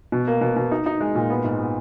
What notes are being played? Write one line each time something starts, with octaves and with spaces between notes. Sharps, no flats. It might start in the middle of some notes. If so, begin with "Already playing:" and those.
B2
A#3
B2
B2
D#4
D#4
G#3
A#2
B3
G#2
B3